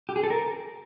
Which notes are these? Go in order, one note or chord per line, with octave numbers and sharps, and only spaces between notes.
G4
G#4
A4
A#4